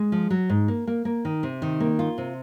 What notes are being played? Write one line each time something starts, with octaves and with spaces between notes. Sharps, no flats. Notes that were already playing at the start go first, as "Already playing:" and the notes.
Already playing: G#3
F3
F#3
G#2
A#3
A#3
A#3
D#3
C3
D#3
A#3
F4
C3